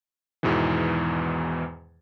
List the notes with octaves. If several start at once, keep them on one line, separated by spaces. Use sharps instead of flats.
E2 G#2 B2 D#3 E3